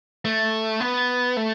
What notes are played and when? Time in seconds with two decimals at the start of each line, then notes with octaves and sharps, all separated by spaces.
0.25 A3
0.80 B3
1.37 A3